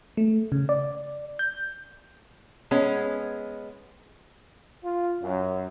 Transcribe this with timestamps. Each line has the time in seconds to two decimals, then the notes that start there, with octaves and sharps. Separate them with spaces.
0.17 A3
0.52 C#3
0.69 D5
1.39 G6
2.71 G#3 B3 C#4
4.84 F4
5.22 F#2